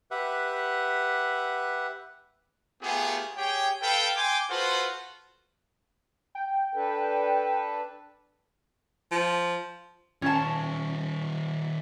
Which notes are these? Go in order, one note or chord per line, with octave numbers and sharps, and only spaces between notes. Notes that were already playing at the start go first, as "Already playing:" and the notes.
G4 B4 E5 F#5
A3 B3 F4 G4 G#4
G4 G#4 C#5 G5
A4 B4 F5 G5
G5 G#5 C6 D6
F4 F#4 A4 B4 C5
G5
D4 A4 B4
F3
D#3 C#4 F4 A5